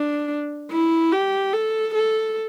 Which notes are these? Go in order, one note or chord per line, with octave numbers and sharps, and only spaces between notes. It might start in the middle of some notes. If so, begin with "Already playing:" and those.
Already playing: D4
E4
G4
A4
A4